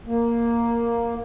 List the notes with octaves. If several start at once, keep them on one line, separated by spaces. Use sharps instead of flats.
A#3